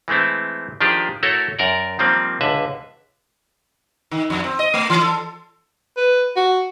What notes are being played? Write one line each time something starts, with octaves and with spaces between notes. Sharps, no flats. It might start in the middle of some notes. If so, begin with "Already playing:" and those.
E3 G#3 A3 C4 E4
D#3 F3 D4 G4 G#4
A3 E4 F#4 A4 A#4 C#5
F#2 A#4 D5
D#3 F3 G3 A#3 C4
C#2 D3 B4 E5
D#3
F2
C4
D#5
A3
E3
A4
B4
F#4